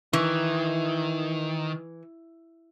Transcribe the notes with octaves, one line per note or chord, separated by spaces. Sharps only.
D#3 E3